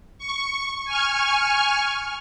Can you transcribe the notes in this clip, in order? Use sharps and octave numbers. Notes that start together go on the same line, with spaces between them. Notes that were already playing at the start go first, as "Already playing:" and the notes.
C#6
G#5 C#6 F6